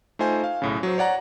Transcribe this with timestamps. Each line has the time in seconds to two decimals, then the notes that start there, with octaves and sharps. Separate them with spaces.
0.19 A3 D#4 F4 C5 G#5
0.44 F5
0.62 B1 A2 C#3
0.83 F#3 C5
0.98 C#5 D5 F#5 A#5